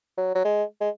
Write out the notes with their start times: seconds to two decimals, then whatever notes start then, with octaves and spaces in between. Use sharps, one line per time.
0.18 F#3
0.35 F#3
0.45 G#3
0.81 G#3